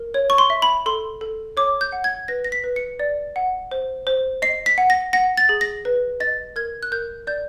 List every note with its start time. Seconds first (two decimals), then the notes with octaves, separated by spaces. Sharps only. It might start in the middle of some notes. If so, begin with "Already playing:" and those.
Already playing: A#4
0.14 C#5
0.30 C#6
0.38 C6
0.50 E5
0.62 B5
0.86 A4 C6
1.21 A4
1.57 C#5 D6
1.81 G6
1.92 F#5
2.04 G#6
2.28 B4 A#6
2.44 A#6
2.52 B6
2.64 B4
2.76 C#7
3.00 D5
3.36 F#5
3.71 C5
4.07 C5
4.42 D#5 C7
4.66 B6
4.78 F#5
4.90 A#6
5.13 F#5 A#6
5.37 A6
5.49 G#4
5.61 A#6
5.85 B4
6.20 D#5 A6
6.56 A#4 G#6
6.83 F#6
6.92 A#4 G6
7.27 D5 G6